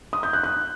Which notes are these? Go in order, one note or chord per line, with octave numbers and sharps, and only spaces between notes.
D#6
G6
F#6
F#6